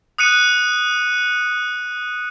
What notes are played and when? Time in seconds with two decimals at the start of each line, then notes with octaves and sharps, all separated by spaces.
0.18 D#6 F#6 C#7 D#7